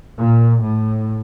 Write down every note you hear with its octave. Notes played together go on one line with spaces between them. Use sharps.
A#2
A2